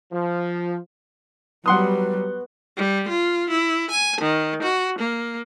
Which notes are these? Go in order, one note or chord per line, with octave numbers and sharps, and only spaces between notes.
F3
F#3 G3 B3 F#4 F#5 C6 D#6
G3
F4
E4
G#5
D#3
F#4
A#3